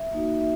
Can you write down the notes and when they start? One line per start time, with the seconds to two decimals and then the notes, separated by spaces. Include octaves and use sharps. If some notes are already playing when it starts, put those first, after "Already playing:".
Already playing: E5
0.12 A#3 D#4 F#4
0.40 E5